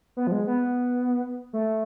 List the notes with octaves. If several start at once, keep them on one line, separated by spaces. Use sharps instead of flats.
B3
F3
G#3
B3
A3